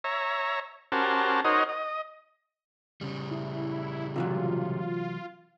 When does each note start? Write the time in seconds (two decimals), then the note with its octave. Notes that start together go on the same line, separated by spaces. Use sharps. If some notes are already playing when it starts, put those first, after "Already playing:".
0.04 C#5 E5 A#5
0.92 C#4 F#4 G4 A#4 C5 A5
1.45 D#4 F#4 A#4 C5 C#5 D#5
1.69 D#5
3.01 C#3 G3
3.31 E4
4.16 C3 E3 F#3 F4